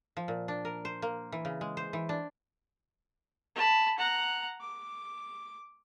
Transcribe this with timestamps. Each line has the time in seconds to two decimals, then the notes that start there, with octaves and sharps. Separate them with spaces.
0.17 F3
0.28 A#2
0.48 D4
0.65 A#4
0.85 C5
1.02 A#3
1.32 E3
1.45 C#3
1.61 G#3
1.77 C5
1.93 E3
2.09 D4
3.55 A5 B5
3.98 F#5 A#5
4.61 D6